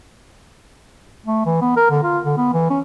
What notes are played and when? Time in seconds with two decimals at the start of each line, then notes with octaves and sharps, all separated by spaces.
1.26 A3
1.46 E3
1.61 B3
1.76 A#4
1.90 D3
2.03 F4
2.25 D3
2.37 B3
2.53 E3
2.70 C#4